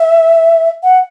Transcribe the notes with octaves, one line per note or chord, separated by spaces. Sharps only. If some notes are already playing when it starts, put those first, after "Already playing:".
Already playing: E5
F#5